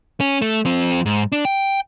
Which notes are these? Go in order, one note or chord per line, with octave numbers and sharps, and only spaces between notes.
C#4
A3
F3 C4
G#2
D4
G5